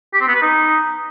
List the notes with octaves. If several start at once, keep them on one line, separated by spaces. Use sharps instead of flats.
G4
C4
B3
B4
D#4